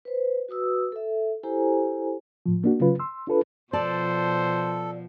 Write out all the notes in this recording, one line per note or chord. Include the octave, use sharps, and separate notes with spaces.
B4 C5
F#4 B4 D#6 E6
A4 E5
E4 G4 A4 C5 G#5 A#5
A2 F3
A#3 D4 F#4
C#3 F#3 C#4 F4 B4
C6 E6
D4 F4 A4 B4
B2 F3 A4 C5 D5 A5